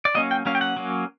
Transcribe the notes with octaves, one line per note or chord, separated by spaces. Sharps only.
D5
F#3 A#3 C#4 D#5
G5
F#3 A#3 C#4 F5
G5
F#5
F#3 A#3 C#4